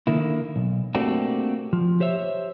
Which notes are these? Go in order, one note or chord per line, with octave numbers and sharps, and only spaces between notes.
D3 D#3 A#3 E4
B1
A3 A#3 C4 D4 F#4 G4
F3
G4 C5 C#5 E5